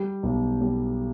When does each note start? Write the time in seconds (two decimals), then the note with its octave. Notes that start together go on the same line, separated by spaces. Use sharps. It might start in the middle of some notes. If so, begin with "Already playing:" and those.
Already playing: G3
0.23 B1
0.61 G3